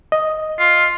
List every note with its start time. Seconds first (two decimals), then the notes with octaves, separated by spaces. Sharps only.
0.12 D#5
0.58 F4